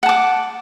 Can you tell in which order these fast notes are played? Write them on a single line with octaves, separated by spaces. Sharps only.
F#5 A5 D6